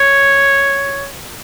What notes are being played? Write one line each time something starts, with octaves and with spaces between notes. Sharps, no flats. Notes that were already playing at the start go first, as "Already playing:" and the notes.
Already playing: C#5